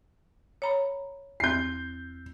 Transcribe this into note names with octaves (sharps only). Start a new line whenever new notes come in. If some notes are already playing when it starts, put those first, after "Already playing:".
C#5 A#5 B5
E2 C4 G6 C7